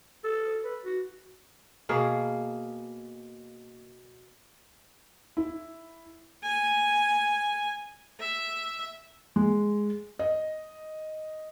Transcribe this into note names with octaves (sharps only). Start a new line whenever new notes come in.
A4
B4
F#4
B2 A#3 G#4 F5
E4
G#5
E5
G#3
D#5